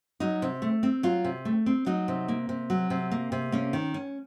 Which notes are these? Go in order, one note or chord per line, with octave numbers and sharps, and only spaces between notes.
F#3 D#4
C3
A3
C4
F#3 F4
C3
A3
C4
F#3 D#4
C3
A#3
C3
F#3
C3
A#3
C3
A#3 C#4
D#3
C#4